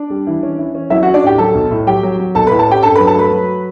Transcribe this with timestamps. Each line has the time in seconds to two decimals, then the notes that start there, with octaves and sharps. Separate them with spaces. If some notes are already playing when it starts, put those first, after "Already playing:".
Already playing: D4 D5
0.10 G3
0.27 E3
0.43 C#4
0.59 E3
0.75 C#4
0.90 F#3 E4 E5
1.03 F#4 F#5
1.07 C#4
1.14 D4 D5
1.23 A2 G4 G5
1.38 F#3 A4 A5
1.54 B1
1.71 A2
1.87 F#3 G4 G5
2.03 F#3
2.19 F#3
2.35 B1 A4 A5
2.47 B4 B5
2.51 A2
2.59 A4 A5
2.67 C#4 G4 G5
2.83 G2 A4 A5
2.95 B4 B5
2.99 F#3
3.07 A4 A5
3.15 A3 B4 B5
3.31 F#3